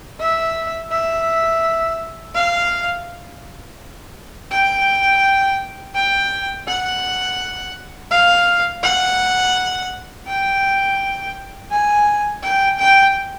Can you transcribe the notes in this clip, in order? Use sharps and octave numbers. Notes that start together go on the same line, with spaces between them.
E5
E5
F5
G5
G5
F#5
F5
F#5
G5
G#5
G5
G5